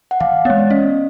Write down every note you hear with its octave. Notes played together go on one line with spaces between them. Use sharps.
F#5
E3 F5
G#3 B3 C#5
D5
C#4 D#5